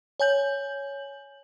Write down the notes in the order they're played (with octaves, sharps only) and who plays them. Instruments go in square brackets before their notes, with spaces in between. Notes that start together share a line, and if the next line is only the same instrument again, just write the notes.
[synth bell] C#5 G#5 G6 F#7